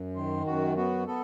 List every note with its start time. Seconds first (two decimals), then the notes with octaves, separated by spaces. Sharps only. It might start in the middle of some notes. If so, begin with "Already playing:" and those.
Already playing: F#2
0.15 D#3 C5
0.46 F#2 F#4
0.77 B3 F#4
1.07 B3 A4